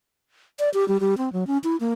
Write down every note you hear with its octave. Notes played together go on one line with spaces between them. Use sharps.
D5
G4
G3
G3
C4
F#3
C#4
E4
A#3